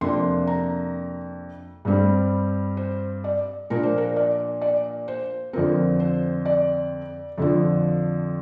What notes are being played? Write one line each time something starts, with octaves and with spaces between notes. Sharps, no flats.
F2 C3 A#3 D4 C6
A#5
G2 G3 C4
C5
D5
A#2 F3 A#3 D4 A#4
C5
A#4
D5
D5
C5
F2 D3 F3 C4 A#4
C5
D5
F2 D3 F3